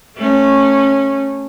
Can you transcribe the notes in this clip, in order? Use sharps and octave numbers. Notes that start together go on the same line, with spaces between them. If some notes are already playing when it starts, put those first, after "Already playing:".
A3 C#4